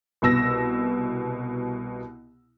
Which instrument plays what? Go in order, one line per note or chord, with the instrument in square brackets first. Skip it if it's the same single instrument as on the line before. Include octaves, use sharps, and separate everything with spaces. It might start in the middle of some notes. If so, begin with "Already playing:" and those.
[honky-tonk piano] C2 B2 E6 A#6